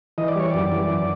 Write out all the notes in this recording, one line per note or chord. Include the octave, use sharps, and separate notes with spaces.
E3 D#5
D5
G3 C#5
F#2 D5
E3
F#2